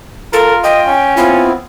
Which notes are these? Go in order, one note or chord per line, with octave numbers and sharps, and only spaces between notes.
F4 A4 A#4
D#5 G5
C#4
B3 C4 E4 F4